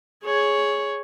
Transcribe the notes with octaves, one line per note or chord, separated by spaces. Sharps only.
G#4 C#5